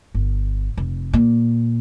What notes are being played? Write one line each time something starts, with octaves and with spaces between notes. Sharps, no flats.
G1
F1
A#2